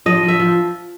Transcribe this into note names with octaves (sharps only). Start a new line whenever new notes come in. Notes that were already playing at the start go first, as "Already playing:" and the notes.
F3 D#5
F3
E5
F3